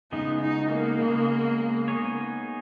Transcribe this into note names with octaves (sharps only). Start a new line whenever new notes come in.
C#3 G#3 B3 D#4
D#4
A#3
C#3 G#3 B3
B3 D#4 G#4 C#5